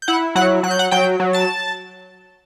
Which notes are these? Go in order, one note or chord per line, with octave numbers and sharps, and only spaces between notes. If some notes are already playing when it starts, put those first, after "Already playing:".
G6
E4 F#5 F#6
F#3 F#5 F#6
F#3 F#6
G6
F#5 F#6
F#3 G5 G6
F#3
A5 A6